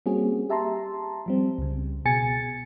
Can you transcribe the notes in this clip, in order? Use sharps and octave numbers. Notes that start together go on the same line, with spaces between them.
G3 A#3 C4 C#4 F#4 G#4
G4 E5 A5 A#5 C6
F3 G3 C4
C#2 C#3
B2 G#4 G#5 A6 C#7